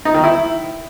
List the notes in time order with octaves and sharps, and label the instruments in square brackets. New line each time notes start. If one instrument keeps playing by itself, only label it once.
[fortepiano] D#4
D#3
E4